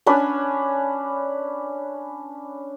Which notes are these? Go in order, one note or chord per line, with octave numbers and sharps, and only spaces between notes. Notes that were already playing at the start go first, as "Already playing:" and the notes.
C#4 D4 B4